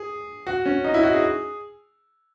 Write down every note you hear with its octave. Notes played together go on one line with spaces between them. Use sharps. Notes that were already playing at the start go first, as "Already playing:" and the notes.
Already playing: G#4
F#4
C#4
D#4
E4
F#4
G#4